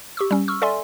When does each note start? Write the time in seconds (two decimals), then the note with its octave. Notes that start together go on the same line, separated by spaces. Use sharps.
0.17 G4 C#6 E6
0.31 G3 C#4
0.48 C#6 E6 F6
0.62 A4 D5 E5 G#5 C6